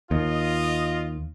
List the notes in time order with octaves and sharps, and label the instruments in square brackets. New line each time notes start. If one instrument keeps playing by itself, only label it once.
[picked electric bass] D#2 [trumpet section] F4 D#5